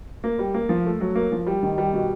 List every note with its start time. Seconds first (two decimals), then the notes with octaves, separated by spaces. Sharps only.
0.24 A#3
0.39 G3
0.54 A#3
0.69 F3
0.85 A3
1.00 F#3
1.15 A#3
1.32 F3
1.46 G3
1.63 D#3
1.78 G3
1.93 B2